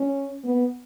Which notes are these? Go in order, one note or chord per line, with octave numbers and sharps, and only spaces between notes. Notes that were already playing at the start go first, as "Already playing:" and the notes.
Already playing: C#4
B3